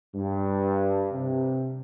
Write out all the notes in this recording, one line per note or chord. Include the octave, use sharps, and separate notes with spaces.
G2
C3